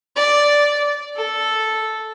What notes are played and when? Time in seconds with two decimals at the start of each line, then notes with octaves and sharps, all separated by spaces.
0.16 D5
1.16 A4